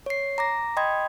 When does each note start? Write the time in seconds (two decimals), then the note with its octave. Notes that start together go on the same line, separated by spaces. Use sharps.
0.06 C#5 C7
0.38 A#5 D6 A#6
0.77 D#5 G5 B5 C6 D#6 G#6